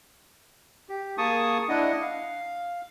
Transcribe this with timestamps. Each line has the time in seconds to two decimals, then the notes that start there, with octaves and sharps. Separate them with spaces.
0.89 G4
1.18 A#3 G#4 A5 C#6 D#6
1.69 D4 E4 D#5 F#5
2.02 F5